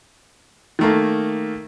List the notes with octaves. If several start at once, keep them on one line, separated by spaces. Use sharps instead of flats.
D#3 A3 A#3